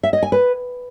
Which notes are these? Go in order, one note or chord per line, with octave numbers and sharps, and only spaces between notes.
E5
D#5
G#5
B4